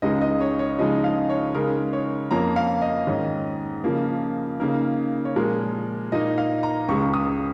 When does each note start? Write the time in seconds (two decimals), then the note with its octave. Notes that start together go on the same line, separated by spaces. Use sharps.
0.02 C#2 C#3 G#3 D#4 D#5
0.22 D#5
0.41 C#5
0.59 C#5
0.78 C#3 F3 G#3 D#4 D#5
1.04 F5
1.29 C#5
1.54 C#3 G#3 D#4 A#4
1.93 C#5
2.31 F2 F3 A#3 C#4 A#5
2.56 F5
2.82 D#5
3.07 G#2 D#3 C#4
3.84 C#3 F3 A#3
4.60 C#3 A#3 D#4 A#4
5.25 C#5
5.36 A#2 F3 G#3 A#4
6.12 A#2 A#3 D#4 D#5
6.38 F5
6.63 A#5
6.88 C#2 C#3 G#3 C#6
7.14 D#6